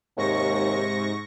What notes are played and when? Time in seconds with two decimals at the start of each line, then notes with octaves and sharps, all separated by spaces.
0.18 D#2 G#2 C3 C#6 A#6